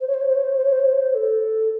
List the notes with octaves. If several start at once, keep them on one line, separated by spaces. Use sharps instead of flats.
C5
C#5
C5
C#5
C5
C#5
C5
C#5
C5
C#5
C5
C#5
C5
C#5
C5
A4